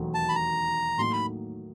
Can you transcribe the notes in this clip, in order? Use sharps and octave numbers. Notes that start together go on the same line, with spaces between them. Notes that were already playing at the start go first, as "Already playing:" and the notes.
Already playing: E1 D#2 D#3 F#3 A3
A5
B5
A#5
A2 F#3 A#3 D#4 C6
B5